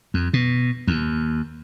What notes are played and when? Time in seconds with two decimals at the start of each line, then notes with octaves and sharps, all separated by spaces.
0.14 F2
0.33 B2
0.87 D#2